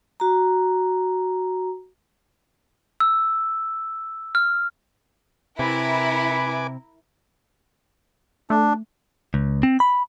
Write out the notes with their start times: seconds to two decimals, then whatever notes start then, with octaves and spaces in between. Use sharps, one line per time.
0.20 F#4 A#5
3.00 E6
4.35 F6
5.59 C3 E4 A#4 B4 G#5 B5 D6
8.50 A3 D4
9.34 C#2
9.63 C4
9.80 B5